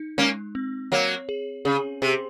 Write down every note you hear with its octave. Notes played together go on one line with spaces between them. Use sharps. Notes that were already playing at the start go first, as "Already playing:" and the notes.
Already playing: D#4
G#3 A#3 C#4
C4
F#3 A#3 C#5
G#4
C#3 G#4
C3 G#4